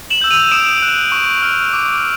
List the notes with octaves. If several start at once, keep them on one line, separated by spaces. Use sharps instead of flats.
E7 F#7
E6 G6
D#7 F7
D#6 D7 E7
F#6
C#6
F6
D6